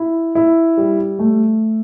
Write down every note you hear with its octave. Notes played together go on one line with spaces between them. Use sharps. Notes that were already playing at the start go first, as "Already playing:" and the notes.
Already playing: E4
E4
G3
A3